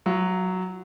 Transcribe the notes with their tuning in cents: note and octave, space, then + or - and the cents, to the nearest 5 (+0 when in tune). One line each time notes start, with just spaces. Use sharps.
F#3 +0 F4 -40